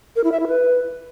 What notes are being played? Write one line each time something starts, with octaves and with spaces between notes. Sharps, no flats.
A#4
E4
E5
E4
B4